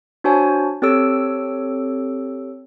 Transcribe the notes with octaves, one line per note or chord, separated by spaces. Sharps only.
D4 F#4 C5 C#5 G#5 A5
C4 G4 A4 C#5 E6 D7